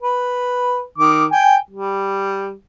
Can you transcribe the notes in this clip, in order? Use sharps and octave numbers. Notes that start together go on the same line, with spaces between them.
B4
D#3 D6
G5 G#5
G3